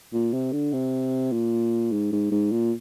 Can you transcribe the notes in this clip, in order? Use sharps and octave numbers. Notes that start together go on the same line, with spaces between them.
A#2
C3
D3
C3
A#2
G#2
G#2
G#2
A#2